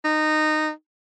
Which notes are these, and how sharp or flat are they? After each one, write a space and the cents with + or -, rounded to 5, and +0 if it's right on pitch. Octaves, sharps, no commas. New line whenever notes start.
D#4 -15